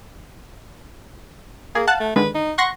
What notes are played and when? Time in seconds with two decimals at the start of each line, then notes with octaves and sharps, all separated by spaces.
1.75 A#3 G#4
1.87 F5 F#5 A5 F#6
2.00 A3
2.16 D3 D#3 G#3 B4
2.35 D#4
2.58 F#5 C6 C#6 A#6